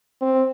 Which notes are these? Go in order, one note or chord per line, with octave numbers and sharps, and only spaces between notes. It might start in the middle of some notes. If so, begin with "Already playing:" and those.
C4